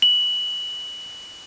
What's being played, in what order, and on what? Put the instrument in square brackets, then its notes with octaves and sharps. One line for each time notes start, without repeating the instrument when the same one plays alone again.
[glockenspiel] F#7